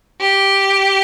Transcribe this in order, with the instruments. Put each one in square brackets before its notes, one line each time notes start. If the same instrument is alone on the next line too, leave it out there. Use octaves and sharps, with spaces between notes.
[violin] G4